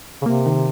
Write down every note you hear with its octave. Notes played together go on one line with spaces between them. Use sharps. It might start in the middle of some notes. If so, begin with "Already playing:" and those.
C#3
C3 A#3
D#3